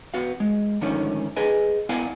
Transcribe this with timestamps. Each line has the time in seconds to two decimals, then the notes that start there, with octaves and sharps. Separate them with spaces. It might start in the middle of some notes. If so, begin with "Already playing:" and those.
0.14 B3 F#4 F5
0.40 G#3
0.81 G#2 D3 D#3 F3 A3 C#4
1.36 G#4 B4 D#5 G#5
1.89 B3 E4 D5 F5 F#5 G#5